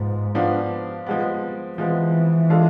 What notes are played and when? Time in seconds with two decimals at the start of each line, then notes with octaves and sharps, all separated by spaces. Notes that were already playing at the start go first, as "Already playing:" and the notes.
Already playing: G#2 F3 B3
0.35 F3 B3 D4 F4
1.06 F3 G#3 B3
1.78 E3 F3 G#3 B3
2.49 G#3 D4 F4 A4